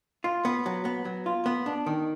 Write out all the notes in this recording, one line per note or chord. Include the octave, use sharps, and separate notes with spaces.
F4
B3
F#3
B3
F#3
F4
B3
D4
D#3